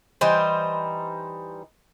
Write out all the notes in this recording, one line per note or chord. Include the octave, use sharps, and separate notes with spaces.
E3 G3 D#4 C5